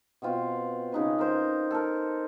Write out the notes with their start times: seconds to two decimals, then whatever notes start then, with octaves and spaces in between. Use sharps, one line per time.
0.22 B2 C4 F4
0.92 C#3 D#4 B4
1.19 A#4 C5
1.71 A4 A#4